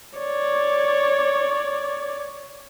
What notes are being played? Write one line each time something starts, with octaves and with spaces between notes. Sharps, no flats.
C#5 D5